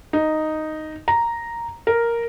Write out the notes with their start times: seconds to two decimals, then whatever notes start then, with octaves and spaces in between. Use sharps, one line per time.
0.13 D#4
1.08 A#5
1.87 A#4